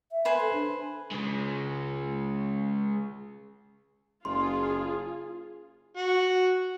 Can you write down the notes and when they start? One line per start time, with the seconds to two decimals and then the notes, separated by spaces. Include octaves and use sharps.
0.12 E5
0.25 B4 C5 G#5
0.40 A4
0.53 D4
1.11 C#3 G#3
4.25 F#1 F4 G#4 C6
5.97 F#4